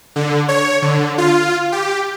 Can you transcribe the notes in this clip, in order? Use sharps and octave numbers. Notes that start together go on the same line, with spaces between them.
D3
C#5
D3
F4
G4